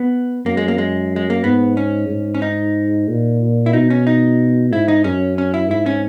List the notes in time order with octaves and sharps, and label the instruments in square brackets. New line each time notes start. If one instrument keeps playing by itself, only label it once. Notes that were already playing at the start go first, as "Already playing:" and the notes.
Already playing: [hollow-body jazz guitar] B3
[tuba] F#2 [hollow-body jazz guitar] A#3
[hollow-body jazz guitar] G#3
A#3
G#3
G#3
A#3
[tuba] G#2 [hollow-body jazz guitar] B3
[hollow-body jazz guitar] C#4
[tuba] G#2
[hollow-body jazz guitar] C#4
D#4
[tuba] A#2
[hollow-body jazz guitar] E4
[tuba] B2 [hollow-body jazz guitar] D#4
[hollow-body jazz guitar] C#4
D#4
[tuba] G#2 [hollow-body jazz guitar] E4
[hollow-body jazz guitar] D#4
[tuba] F#2 [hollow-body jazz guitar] C#4
[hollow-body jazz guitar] C#4
E4
[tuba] G#2 [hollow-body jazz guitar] E4
[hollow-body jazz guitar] C#4